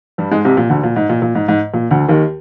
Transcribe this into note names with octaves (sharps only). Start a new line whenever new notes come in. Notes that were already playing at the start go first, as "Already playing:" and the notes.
G2 G3
G#2 G#3
C2 C3
A#2
D2 D3
A#2
G#2
A#2
A#2
G#2
G#2
A#2
D2 D3
D#2 D#3